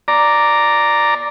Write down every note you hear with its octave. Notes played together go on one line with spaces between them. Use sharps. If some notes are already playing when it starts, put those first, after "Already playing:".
D5 A#5